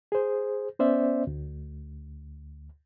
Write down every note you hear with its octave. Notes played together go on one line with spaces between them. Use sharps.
G#4 C5
B3 C#4 C5 D5 E5
D2